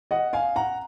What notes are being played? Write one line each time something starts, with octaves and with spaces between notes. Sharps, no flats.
D#5 F#5
F5 G#5
F#5 A#5